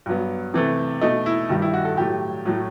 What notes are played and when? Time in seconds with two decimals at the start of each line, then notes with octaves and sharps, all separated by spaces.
0.06 G2 F#3 B3
0.54 C3 E3 A3
1.01 B2 A3 D#4
1.26 E4
1.49 G2 D#3 G3
1.62 E4
1.74 F#4
1.85 A4
1.97 A2 F#3 A3 G4
2.45 A2 F#3 A3